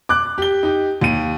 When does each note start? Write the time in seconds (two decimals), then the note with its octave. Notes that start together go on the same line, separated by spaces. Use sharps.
0.09 D6 F#6
0.38 G4 G7
0.63 D#4 G4
1.01 D#2 D#7